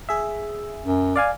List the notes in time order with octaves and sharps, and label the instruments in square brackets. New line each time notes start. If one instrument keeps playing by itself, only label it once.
[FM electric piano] G#4 E5
[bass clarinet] F#2
[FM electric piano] D5 F5 G#5